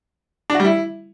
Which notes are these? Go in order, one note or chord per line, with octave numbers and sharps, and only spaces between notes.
D4
F#4
G3
E4